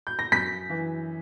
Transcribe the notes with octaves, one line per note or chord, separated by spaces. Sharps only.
G6
A#6
F#2 B6
E3